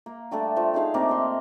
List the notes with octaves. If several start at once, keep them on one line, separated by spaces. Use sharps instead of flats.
A#3
G3 A3 D4 A4
F3 A3
D#4 G#4 F5 B5
C3 A3 A#3 D4
D#5 C6